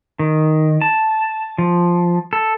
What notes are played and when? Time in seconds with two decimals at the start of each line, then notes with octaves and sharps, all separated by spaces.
0.19 D#3
0.81 A5
1.58 F3
2.33 A4